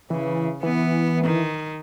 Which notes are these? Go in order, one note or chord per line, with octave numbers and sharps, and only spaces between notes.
C#3 E3
E3 B3
D#3